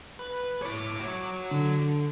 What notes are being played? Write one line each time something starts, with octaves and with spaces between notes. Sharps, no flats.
B4
E4 C#5 D6
F#4 C#5
D3